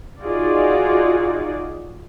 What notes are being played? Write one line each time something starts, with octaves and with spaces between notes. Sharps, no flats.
D#4 F4 F#4 G#4 D5